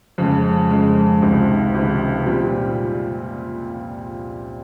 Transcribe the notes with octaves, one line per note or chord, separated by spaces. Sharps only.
F2 C#3 G#3
F2 C#3 G#3
C#2 C3 D#3
C#2 C3 D#3
A#2 G3 C4 F4